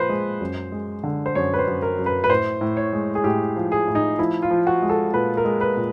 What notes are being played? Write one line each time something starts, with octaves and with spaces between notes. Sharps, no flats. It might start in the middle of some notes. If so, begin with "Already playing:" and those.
Already playing: A#2 F3 B4 C5
G#3
F#2
G#3
D3
C5
F#2 C#5
B4
C5
F#2
A#4
F#2
B4
B4
A2 C5
A2
C#5
G#3
G#4
A2 G4
F3
G#4
A2
D#4
F3 E4
F4
F3
F#4
G#3
A4
A#2 B4
A#4
G#3
B4
A#2